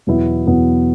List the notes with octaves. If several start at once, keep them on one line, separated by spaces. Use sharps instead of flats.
E2 B2 F#3 B3 E4
E2 B2 F#3 B3 E4